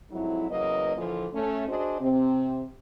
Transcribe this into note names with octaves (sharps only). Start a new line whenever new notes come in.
F2 G#2 F#3 E4
E2 C#3 F#3 A#3 B4 D#5
A#2 D3 E3 F3
A3 C#4
D4 F#4 G#4 C5 D5 D#5
C3 C4